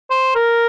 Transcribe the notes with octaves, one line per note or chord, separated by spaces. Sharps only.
C5
A#4